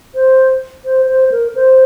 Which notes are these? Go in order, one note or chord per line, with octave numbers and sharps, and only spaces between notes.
C5
C5
C5
A#4
C5